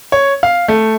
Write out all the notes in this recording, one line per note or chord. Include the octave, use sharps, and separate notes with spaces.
C#5
F5
A3